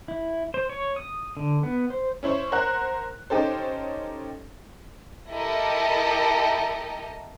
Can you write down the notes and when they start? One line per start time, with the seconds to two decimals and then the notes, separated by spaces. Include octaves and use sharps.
0.08 E4
0.54 C5
0.69 C#5
0.96 D#6
1.37 D3
1.63 B3
1.90 C5
2.23 C#4 E4 C5 C#5
2.52 A#4 C5 F#5 F#6
3.30 C#4 D#4 G4 A4 C5
5.32 E4 G4 A4 A#4 D#5